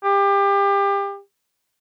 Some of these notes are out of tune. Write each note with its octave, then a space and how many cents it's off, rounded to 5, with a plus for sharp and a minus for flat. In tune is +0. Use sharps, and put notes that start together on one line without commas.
G4 +25